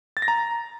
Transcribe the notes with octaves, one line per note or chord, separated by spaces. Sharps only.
A6
A#6
A#5